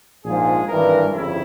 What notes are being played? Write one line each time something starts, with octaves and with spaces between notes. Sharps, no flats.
A#1 G#2 F3 G#4
G#1 G2 E3 A#4
G1 F2 C#3 E4